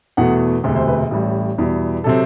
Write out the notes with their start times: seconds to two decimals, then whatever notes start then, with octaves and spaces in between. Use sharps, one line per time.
0.17 E2 B2 A3 F#5
0.64 E1 D2 C3 E5
0.76 C5
0.87 B4
1.11 A1 A2 G3
1.58 E2 B2 G3
2.04 C3 F#3 C4 A4